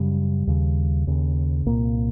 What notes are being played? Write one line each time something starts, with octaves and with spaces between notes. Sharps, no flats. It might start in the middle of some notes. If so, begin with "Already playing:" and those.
Already playing: F#2 C#3 G3
D#2 C#3
D#2 C#3
C2 A#2 A#3